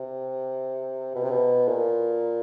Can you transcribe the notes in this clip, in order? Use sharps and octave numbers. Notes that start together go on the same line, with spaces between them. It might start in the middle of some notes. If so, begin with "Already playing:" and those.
Already playing: C3
B2
C3
B2
A#2